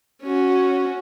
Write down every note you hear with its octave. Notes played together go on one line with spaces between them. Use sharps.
C#4 F#4